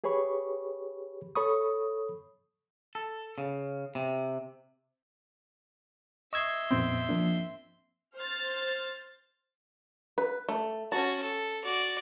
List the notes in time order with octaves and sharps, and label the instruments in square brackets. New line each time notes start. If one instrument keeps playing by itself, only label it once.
[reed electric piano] G4 G#4 B4 C#5 B5 C#6
A4 C#5 B5 C#6 D#6
[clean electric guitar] A4
C#3
C3
[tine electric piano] D#5 E6 G#6 [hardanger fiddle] E5 C6 [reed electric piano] C#6
[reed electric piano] F2 A#2 B3 [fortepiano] C4
[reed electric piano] F3 A#3 D4
[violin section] C5 F6 A6
[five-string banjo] B4
A3
[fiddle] C#4 F#4 [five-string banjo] A5
[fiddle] A4
F#4 D5